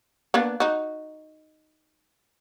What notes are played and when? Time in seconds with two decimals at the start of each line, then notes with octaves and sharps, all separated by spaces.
0.34 A#3 B3 D4
0.60 D#4 F#4